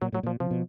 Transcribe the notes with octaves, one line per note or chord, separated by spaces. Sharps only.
A#2 F#3
A2 F#3
A#2 F3
C3 F3
B2